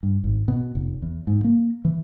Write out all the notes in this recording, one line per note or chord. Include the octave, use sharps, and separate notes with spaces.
G2
G#1
B2
F1
E2
G#2
A#3
E3